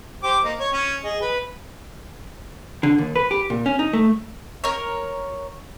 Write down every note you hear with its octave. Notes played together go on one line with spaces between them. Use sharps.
G4 C5 D6
A#3 D#4
C#5
C#4
G#4 D#5
B4
D3
D#2
B4
G4
A#2
C#4
D#4
A3
A#4 C#5